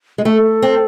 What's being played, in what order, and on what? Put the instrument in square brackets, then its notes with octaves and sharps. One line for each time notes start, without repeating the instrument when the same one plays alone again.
[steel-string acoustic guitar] G#3
[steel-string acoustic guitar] A3 [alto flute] A4
[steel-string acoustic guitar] C4